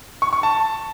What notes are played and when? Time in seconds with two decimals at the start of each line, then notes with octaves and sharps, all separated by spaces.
0.22 C#6
0.33 C#6
0.43 A5